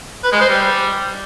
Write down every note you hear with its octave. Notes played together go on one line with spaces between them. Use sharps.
B4
G#3
C5
G3